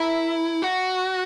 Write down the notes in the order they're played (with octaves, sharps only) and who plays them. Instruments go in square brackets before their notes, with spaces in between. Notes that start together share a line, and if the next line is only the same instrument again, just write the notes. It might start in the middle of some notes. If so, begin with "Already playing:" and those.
Already playing: [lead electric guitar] E4 [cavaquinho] A#4 E5 B5
[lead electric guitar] F#4